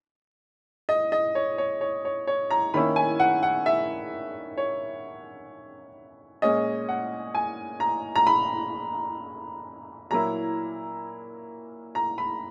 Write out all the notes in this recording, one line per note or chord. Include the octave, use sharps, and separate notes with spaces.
D#5
D#5
C#5
C#5
C#5
C#5
C#5
A#5
D#3 A#3 C#4 E4 B5
G#5
F#5
F#5
E5
C#5
A#2 G#3 C#4 D#5
F#5
G#5
A#5
A#5
B5
A#2 F#3 A#3 E4 A#5
A#5
B5